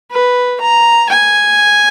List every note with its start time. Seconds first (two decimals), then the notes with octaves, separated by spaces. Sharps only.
0.11 B4
0.60 A#5
1.09 G#5